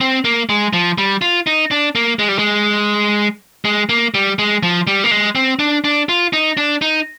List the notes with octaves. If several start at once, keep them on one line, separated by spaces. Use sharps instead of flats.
C4
A#3
G#3
F3
G3
F4
D#4
D4
A#3
G#3
G3
G#3
G#3
A#3
G3
G#3
F3
G3
A#3
G#3
C4
D4
D4
F4
D#4
D4
D#4